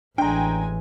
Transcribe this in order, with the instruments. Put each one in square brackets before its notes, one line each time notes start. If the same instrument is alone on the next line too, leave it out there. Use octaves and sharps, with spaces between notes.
[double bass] A1 E3 [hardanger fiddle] G#3 G#5 [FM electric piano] D4 A#5 [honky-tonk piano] G5